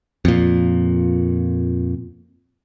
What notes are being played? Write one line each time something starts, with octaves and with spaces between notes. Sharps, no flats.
F2 A#2